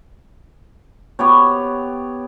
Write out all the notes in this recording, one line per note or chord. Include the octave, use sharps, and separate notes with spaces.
B3 G4 C#5